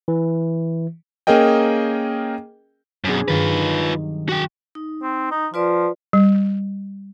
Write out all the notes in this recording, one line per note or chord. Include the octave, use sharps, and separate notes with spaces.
E3
A#3 C#4 G#4 A#4 D#5 G5
F#2 B2 C4 D4 G#4
G2 D#3 F#3 F4 B4
F#4 G5
D#4
C4
D#4
F3 F4 B4 D5
G3